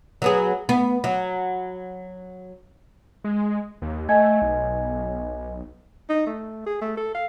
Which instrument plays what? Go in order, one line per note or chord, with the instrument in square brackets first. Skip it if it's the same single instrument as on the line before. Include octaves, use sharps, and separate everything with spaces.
[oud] F#3 B3 G#4
B3
F#3
[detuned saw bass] G#3
D#2
[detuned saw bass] A3 [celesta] D#5 G#5 G#6
[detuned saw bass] B1
[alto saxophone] D#4
A3
G#4
A3
A4
F5